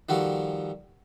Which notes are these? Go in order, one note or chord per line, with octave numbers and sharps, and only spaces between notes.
D#3 F3 G3 F#4 A4